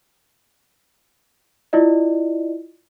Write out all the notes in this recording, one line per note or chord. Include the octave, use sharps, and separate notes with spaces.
E4 F4 D5 D#5